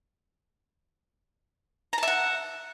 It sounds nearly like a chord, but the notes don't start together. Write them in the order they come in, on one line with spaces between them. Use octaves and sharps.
A#5 A5 E5 F#5